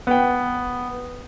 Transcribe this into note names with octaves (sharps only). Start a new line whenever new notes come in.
B3 G5